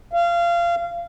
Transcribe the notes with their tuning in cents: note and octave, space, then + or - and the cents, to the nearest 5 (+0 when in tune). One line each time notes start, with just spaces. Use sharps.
F5 -25